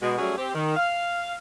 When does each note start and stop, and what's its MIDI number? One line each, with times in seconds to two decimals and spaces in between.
0.02 0.18 47
0.02 0.18 56
0.19 0.36 54
0.19 0.36 55
0.19 0.36 57
0.19 0.36 61
0.19 0.36 66
0.19 0.36 68
0.38 0.54 60
0.38 0.54 67
0.55 0.75 51
0.77 1.35 77